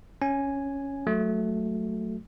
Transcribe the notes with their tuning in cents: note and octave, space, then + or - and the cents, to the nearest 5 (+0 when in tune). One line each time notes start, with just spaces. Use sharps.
C#4 +0 G#5 +0
F#3 +0 A3 +0 F#4 +0